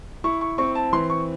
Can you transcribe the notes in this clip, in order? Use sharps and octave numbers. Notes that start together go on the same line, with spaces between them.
E4 C#6
C#6
C4 C#6
A5
E3 C6
C#6